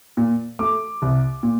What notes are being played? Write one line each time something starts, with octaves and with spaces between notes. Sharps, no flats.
A#2
A3 D6
C2
A#2